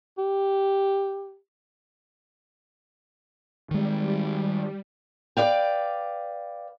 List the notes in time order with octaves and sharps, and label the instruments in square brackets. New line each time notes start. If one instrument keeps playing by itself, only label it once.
[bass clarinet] G4
[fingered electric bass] D#3 G#3 [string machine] G3
[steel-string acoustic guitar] B4 D5 F5 G5